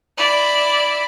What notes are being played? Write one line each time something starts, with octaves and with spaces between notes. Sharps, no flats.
E4 D5